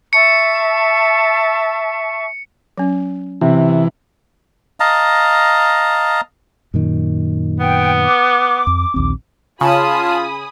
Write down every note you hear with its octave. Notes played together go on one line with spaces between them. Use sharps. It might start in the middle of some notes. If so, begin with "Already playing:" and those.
E5 A5 C#6 C#7
F#3 C#4
C3 E3
D#5 F5 A5 A#5
F#2 A#2 D#3
B3 G5
D6
F2
A#1 D#2 C4
C#3 F4 G#5 A5 B5 D#6